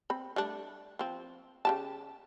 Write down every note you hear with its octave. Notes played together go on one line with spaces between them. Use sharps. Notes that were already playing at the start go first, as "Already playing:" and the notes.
C4 B5
G3 A3 D4
F3 C4
C#3 G4 A5